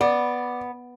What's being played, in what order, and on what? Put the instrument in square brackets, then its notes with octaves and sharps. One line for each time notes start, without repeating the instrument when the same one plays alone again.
[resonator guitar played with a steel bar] B3 [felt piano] D5